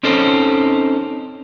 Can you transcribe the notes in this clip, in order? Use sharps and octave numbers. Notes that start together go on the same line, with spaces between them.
C4 C#4 D#4 A4 C5